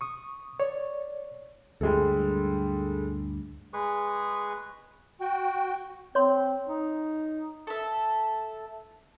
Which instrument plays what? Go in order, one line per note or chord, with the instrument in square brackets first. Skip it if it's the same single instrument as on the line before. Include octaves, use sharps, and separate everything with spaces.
[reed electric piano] C#6 D#6
C#5 D5
[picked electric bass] D2 G2 [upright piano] G3 G#3 A4
[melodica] G#3 G#4 B4 C#6
[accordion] F#4 G5
[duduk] C4 [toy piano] C#5 C6
[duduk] D#4
[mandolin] A4 E5